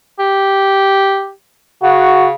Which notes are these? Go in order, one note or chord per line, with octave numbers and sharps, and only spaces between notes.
G4
C#3 F#4